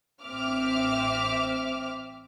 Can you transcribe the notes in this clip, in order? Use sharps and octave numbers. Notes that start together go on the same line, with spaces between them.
A1 C4 E5 D6 F6